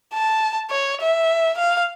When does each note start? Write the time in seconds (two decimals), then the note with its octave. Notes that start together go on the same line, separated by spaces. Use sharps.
0.14 A5
0.71 C#5
1.01 E5
1.58 F5